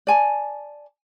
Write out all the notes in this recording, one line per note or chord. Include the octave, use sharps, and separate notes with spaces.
D5 G#5 A5